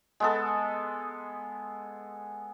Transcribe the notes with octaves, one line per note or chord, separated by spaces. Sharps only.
G#3 B3 A4